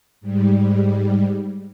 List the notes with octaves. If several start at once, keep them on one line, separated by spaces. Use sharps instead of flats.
G#2 G3